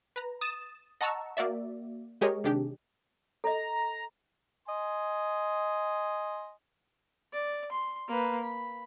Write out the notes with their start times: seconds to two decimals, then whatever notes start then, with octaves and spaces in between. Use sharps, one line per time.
0.16 B4 A#5
0.41 D#6 A6 E7
1.01 D#5 F#5 A5 A#5 C#6 E6
1.37 A#3 F#4 D5 E5
2.21 G#3 G4 G#4 A#4 C#5 D#5
2.44 C3 D#3 D4 G4 G#4
3.44 A4 D#5 A#5
4.68 D#5 G#5 C6
7.33 D5
7.72 C6
8.08 A#3 B4
8.43 B5